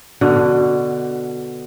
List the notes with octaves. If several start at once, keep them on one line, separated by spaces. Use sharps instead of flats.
B2 D3